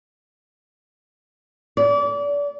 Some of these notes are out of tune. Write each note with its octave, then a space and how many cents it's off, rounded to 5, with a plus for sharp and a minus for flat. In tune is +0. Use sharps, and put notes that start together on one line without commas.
D5 -30